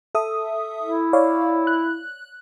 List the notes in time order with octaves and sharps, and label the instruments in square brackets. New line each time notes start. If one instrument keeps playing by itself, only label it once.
[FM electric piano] A4 E5 D#6
[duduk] E4
[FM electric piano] C#5 D5 F5
F#6